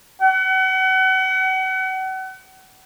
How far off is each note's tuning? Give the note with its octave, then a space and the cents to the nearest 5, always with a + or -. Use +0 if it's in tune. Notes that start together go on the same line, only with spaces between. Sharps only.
F#5 +35